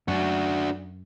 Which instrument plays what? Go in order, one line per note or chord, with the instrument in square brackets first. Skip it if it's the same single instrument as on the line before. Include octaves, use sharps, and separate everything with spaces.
[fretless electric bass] F#2 [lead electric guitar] D4 F#4